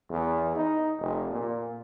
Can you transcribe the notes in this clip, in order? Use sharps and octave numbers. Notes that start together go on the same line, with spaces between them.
E2
D#4
F1
A#2